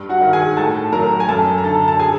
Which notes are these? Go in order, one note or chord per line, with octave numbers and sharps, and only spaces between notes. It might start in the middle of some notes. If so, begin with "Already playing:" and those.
Already playing: G2
F#4 F#5
D#3
G#4 G#5
A2 A4 A5
F#3 A#4 A#5
G#5
F#2 A4 A5
A#5
D3 A4 A5
A5
G#4 G#5